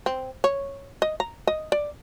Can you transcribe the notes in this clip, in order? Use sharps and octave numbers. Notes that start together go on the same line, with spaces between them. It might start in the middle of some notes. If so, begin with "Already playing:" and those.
C4
C#5
D#5
A#5
D#5
D5